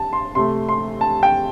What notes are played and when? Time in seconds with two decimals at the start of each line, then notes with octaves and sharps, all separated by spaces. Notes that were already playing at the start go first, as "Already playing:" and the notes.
Already playing: C3 A5
0.13 C6
0.35 C3 A3 C6
0.69 C6
1.01 A5
1.23 G5